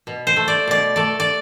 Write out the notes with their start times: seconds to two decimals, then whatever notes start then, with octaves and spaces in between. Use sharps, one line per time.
0.07 B2
0.27 C5
0.37 A3
0.48 D5
0.68 B2 D5
0.96 A3 D5
1.20 D5